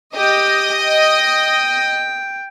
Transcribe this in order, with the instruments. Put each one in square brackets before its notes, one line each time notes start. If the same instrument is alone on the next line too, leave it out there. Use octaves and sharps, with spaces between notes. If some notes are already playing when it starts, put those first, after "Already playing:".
[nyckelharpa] G4 G5 [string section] D#5
[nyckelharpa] G5